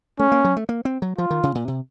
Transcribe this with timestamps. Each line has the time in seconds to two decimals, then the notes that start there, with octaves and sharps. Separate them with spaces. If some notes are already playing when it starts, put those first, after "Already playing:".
0.19 A3 C#4
0.32 A#3
0.44 F#3
0.57 A3
0.69 A#3
0.85 C4
1.02 F#3
1.18 F3 F4
1.30 D#3
1.43 C#3
1.55 A#2
1.68 C3